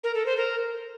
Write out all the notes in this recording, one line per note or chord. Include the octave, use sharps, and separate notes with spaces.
A#4
A4
C5
A#4